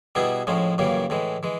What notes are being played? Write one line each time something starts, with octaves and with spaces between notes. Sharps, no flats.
B2 G3 B3 E4 G#4
A2 F3 G#3 C#4
F#2 C#3 E3 G3 A#3
A2 E3 G#3
E3 G#3